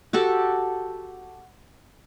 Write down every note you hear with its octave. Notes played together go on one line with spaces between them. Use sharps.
F#4 G4 A4 A5